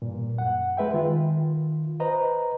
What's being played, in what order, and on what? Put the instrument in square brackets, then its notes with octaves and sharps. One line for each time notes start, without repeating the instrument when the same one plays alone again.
[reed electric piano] G2 A#2
F#2 F#5
G#3 B4 E5 G5
D#3 F4
B4 C5 D#5 A#5